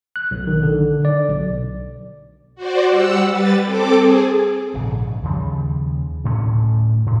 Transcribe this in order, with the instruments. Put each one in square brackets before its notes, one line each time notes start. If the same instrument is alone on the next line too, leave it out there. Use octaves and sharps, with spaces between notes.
[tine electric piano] F#6
B1
D#3
D3
D5
B1
[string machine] F#4 C5 D5
G3 F#5 E6
G3 B4 A6
C4 A4 D6
G#4
[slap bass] A#1 G#2 C#3
D#2 C#3 F3 G3
D2 A2 A3 C#4
A2